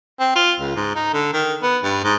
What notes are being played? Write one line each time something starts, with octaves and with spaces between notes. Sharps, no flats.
C4
F4
C#2
G#2
D#4
D3
D#3
B3
G2
G#2